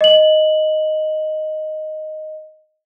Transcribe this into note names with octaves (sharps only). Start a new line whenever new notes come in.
D#5 F#7